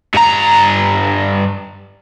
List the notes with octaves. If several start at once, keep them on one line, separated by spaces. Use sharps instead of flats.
G2 A#5